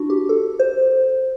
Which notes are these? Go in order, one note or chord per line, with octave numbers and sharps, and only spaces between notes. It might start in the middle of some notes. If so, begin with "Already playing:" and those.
Already playing: D4 E4 F#4
G4
A4
C5